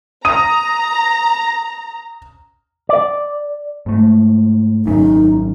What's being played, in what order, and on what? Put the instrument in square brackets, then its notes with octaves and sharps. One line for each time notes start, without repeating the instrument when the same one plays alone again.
[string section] A#5 [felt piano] D#6 D#7
[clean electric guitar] D5
[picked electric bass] G#2 A3
[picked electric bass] G#1 F#2 C#3 [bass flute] D#4